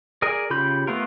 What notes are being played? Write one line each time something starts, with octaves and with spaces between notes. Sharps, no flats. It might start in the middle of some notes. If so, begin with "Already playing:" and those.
G#4 A#4 D5 G#5
C#3 F4 G4 B5 G6
A3 B3 F4 A#4